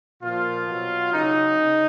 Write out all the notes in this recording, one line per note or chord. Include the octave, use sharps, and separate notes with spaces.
A#2 F3 F4
B2 F#3
C#3 F#3 D#4
C#3